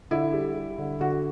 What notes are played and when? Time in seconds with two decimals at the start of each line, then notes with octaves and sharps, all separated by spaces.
0.11 D3 E4
0.33 G3
0.55 G3
0.78 D3
1.00 D3 F#4